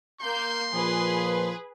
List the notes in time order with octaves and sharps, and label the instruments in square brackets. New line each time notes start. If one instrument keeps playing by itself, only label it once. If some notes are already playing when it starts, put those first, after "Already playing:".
[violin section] A#3 G6 [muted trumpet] C6
[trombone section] A#2 F3 [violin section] G#4 B4